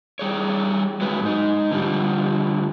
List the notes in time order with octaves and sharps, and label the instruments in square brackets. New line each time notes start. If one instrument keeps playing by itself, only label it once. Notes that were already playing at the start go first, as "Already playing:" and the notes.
[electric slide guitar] G3 G#4 C#5
F#3 G#3 B4
G#2 D#4
D3 F3 G3